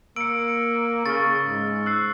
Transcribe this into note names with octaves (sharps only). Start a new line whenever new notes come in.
A#3 E6 C#7 D7
C#3 C#6 F6 A6
G#2
E6 F#6 C7